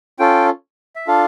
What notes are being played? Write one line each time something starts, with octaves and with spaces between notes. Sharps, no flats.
C#4 F4 A4 G5
E5
D4 F4 A4 F5